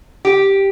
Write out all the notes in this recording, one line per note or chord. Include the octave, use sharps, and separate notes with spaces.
G4